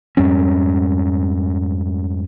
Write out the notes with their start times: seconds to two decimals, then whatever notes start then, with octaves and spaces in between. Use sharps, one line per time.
0.17 F2 G#2 G3 C#4